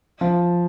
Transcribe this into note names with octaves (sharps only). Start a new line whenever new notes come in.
F3